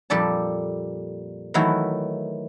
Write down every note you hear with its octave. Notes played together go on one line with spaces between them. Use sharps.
F2 A#2 G3 A4 D5 A5
D#3 E3 F#3 A3 E4